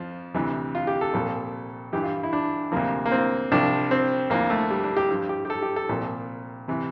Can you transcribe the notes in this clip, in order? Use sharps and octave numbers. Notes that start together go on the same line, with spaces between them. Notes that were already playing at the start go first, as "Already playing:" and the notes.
Already playing: F2 F3
D2 C3 E3
F4
G4
A4
C2 A#2 F3
G2 E3 G4
F4
E4
D4
D2 C3 F3 A#3
A#3
C4
C2 C3 F3 D4
C4
D2 D3 F3 A#3
A3
G3
D4
G4
G2 F3
G4
G4
A4
G4
A4
C2 A#2 F3
C3 E3